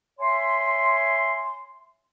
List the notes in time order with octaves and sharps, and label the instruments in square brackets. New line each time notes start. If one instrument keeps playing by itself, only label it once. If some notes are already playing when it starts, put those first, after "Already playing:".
[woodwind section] C#5 E5 G#5 C6